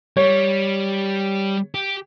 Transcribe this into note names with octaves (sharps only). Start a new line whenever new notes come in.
G3 C#5
G4